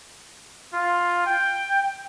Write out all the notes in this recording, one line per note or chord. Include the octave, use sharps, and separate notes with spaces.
F4
G5